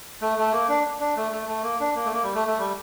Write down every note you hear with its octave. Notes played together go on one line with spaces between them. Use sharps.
A3
A3
A#3
D4
D4
A3
A3
A3
A#3
D4
A#3
A3
A#3
G3
A3
A3
G3